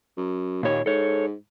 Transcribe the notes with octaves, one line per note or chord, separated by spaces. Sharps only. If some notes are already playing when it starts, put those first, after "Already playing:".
F#2
D#2 A#2 C#5
G#2 A4 C#5